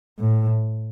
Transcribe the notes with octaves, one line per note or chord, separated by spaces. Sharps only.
A2